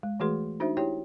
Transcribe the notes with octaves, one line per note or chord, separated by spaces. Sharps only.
G#3
E3 A3 F#4 G#4 B4 C6
D4 D#4 F#4 C5 E5
E4 G4 C#5 G5